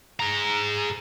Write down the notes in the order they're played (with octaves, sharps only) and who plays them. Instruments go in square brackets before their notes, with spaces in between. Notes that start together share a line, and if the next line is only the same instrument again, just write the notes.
[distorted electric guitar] G#4 A#5